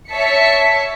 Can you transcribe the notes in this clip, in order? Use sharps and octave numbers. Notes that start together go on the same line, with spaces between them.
C#5 E5 A5 B6 C#7